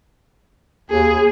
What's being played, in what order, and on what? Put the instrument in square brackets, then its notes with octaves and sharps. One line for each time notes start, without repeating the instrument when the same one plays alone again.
[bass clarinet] D#2 [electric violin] G#4